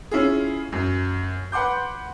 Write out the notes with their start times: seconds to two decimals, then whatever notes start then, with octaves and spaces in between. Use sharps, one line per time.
0.11 C#4 E4 F4 G#4
0.72 F#2
1.52 B4 F#5 C6 D6 G6